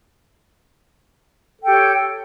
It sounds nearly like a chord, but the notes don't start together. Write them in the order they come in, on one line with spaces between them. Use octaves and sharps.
A4 G5 G4 C#5